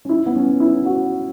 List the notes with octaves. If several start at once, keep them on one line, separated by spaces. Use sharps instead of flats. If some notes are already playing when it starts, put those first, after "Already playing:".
C#4
E4
B3
C#4
E4
F#4